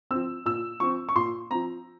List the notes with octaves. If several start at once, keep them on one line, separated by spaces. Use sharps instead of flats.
F3 C4 E6
A#2 E6
F3 C4 C#6
C#6
A#2 C6
F3 C4 A#5